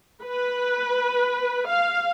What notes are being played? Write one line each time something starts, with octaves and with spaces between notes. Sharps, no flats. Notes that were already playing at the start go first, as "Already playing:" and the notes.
B4
F5